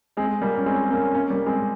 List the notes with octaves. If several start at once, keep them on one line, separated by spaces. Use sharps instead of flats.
G#3 C4
G3 A#3
C#4
G#3 C4
C4
A#3 C#4
A#3 C#4
G3 A#3
G#3 C4